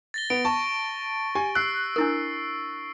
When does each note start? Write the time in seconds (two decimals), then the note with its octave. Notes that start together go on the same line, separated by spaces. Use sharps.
0.14 A6 A#6 G7
0.30 B3 D7
0.45 A5 C#6
1.35 G4 G#5
1.55 E6 F#6 C7
1.96 D4 E4 A#4